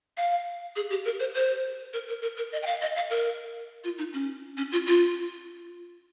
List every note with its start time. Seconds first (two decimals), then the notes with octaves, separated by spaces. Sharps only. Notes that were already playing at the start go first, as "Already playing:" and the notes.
0.17 F5
0.76 G#4
0.90 G4
1.05 A#4
1.20 C5
1.34 C5
1.93 A#4
2.08 A#4
2.22 A#4
2.37 A#4
2.52 D#5
2.63 G5
2.66 F5
2.82 D#5
2.96 F5
3.10 A#4
3.84 F4
3.98 D#4
4.13 C#4
4.57 C#4
4.72 F4
4.87 F4